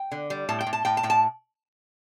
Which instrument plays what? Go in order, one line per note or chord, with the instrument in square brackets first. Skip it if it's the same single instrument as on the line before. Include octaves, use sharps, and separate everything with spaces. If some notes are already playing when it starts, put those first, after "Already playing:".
Already playing: [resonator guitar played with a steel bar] G5
D3
G3
A2 A5
G5
A2
A5
A2 G5
A5
A2 G5
A5